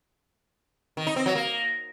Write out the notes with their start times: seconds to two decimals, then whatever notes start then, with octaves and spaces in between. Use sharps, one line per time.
0.97 D#3
1.07 D#4
1.16 C4
1.26 F#3
1.35 A#3